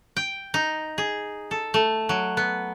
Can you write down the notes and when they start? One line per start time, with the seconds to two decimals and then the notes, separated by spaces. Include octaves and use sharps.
0.16 G5
0.54 D#4
0.98 G#4
1.51 A4
1.74 A3
2.09 F#3
2.37 B3